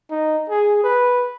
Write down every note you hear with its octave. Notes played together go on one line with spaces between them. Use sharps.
D#4
G#4
B4